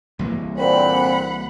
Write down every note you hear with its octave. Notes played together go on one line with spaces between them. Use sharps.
C2 E3 A#3
A#2 D3 C4 F#5 B5